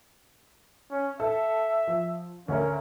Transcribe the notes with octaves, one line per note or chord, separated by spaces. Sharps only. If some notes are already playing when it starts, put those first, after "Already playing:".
C#4
A4 E5
F3
D2 C#4 A#4